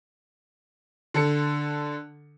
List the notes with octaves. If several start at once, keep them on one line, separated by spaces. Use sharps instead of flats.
D3 A4 C#7